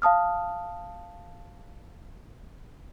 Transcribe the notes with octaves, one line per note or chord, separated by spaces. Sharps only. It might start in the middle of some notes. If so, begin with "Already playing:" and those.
F5 A5 D#6 F6